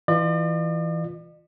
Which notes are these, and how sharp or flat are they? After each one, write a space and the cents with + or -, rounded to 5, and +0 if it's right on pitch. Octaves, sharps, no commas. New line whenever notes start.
E3 +0 F4 +0 D5 +45